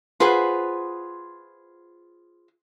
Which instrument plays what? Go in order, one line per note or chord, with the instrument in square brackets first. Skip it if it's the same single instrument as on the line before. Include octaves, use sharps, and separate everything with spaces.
[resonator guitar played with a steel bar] F4 G#4 B4 C5 F#5